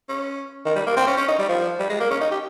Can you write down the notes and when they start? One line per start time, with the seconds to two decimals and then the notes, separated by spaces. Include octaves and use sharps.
0.09 C#4
0.66 D#3
0.76 G3
0.87 A#3
0.97 C4
1.07 C#4
1.17 C#4
1.28 D#4
1.39 G3
1.49 F3
1.79 G3
1.90 G#3
2.00 A#3
2.10 C#4
2.21 D#4
2.31 G4